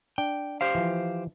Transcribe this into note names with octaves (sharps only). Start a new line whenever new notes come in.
D4 G5
G4 C5 F5
E3 F3